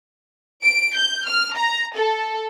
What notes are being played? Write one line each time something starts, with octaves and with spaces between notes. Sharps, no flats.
D7
G6
F6
A#5
A4